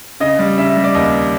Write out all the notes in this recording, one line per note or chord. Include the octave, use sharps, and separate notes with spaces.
C#3 D#5
G3
C#3 E5
G3
D5
D#2 D#5